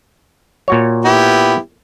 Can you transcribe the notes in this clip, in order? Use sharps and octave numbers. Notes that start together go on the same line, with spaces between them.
A#2 F#4 C#5
B3 E4 G4